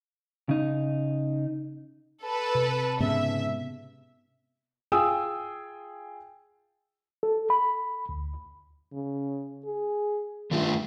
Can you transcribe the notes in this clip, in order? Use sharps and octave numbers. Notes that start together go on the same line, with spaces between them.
C#3 D#4
A4 B4
C3
G#2 C#3 B3 E5
F4 G#4 G5 G#5 D#6 E6
A4
B5
D2
C#3
G#4
G2 D#3 A3 F4